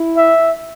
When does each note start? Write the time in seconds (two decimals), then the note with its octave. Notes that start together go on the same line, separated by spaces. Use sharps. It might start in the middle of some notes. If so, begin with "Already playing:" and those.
Already playing: E4
0.17 E5